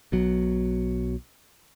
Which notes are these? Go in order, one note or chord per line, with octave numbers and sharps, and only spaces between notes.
B1 B2 F#3